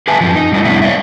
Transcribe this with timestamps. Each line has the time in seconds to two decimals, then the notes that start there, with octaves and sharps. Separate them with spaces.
0.08 G#4 B4 E5 G#5 A5
0.21 F#2 F3
0.35 D#4
0.52 F#2 G3 D#4 E4 D5
0.64 F2 C3 G3 B3 D4 E4
0.82 C#5 D5 E5